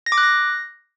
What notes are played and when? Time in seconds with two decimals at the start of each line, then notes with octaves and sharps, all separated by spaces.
0.06 A#6
0.12 D6
0.18 F#6
0.23 A#6